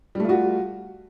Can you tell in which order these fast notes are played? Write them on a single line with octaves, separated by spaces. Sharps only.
G3 A3 F4 F#4